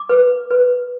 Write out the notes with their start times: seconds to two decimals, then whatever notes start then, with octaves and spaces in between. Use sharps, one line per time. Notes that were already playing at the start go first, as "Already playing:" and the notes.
Already playing: D6
0.09 B4
0.50 B4